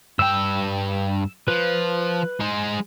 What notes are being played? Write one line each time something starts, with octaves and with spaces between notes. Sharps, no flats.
G2 G5 E6
F3 B4
G#3 C5